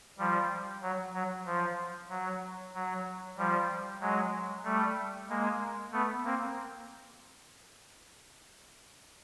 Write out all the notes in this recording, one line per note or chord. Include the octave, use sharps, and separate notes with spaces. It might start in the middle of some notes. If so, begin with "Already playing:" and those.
F3 G3
F#3
F#3
F3
F#3
F#3
F3 G3
F#3 G#3
G3 A3
G#3 A#3
A3 B3
A#3 C4